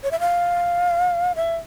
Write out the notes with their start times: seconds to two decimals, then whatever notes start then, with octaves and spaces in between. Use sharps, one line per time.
0.03 C#5
0.11 E5
0.20 F5
1.36 E5